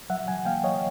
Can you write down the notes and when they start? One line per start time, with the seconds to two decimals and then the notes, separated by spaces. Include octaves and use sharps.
0.10 F#3 E5 F#5
0.27 F#3 F#5 G#5
0.45 A#3 F5 G5
0.64 F#3 C#5 D#5